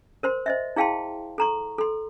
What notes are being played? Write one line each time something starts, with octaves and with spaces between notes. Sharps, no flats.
A#4 C5 C6
C5 D#5 E5
E4 G#4 F5 G5 A5 C6
A4 A#5 C#6
A4 C6